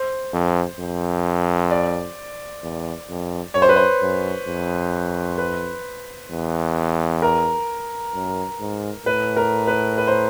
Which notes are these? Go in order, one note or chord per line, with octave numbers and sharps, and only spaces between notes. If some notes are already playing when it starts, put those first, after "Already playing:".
Already playing: C5
F2
F2
D5
E2
F2
F#2 C#5
C5
B4
C5
F#2
F2
B4
E2
A#4
F#2
G#2
A2 B4
A#4
B4
B4
C5